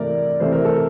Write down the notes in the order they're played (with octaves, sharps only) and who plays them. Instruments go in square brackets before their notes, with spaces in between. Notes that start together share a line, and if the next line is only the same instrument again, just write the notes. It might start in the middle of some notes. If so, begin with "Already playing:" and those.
Already playing: [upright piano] C3 E3 A3 [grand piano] A#4 D5
[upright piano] C3 E3 A3 [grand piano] C5
[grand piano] A#4
A4